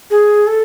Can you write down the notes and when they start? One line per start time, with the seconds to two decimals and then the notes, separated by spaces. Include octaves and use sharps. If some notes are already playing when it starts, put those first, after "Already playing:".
0.10 G#4
0.47 A4